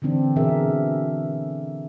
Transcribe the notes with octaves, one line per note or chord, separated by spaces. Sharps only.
D3 E3 C4 D4
B2 E3 G#4 A#4 E5